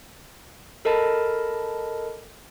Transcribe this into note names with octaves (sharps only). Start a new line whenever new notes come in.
A4 A#4 D#5 A5 B5